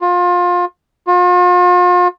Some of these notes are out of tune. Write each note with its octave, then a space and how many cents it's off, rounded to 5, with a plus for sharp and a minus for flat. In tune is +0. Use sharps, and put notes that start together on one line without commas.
F4 +25
F4 +40